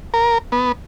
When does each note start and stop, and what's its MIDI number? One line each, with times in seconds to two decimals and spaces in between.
0.14 0.38 70
0.52 0.72 59